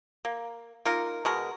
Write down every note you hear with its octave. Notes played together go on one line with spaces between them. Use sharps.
A#3
A#3 D#4 F4 A#4
B2 G#3 A#4